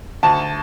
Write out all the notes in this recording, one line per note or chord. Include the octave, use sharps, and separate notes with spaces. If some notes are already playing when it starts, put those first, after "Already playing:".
D2 A5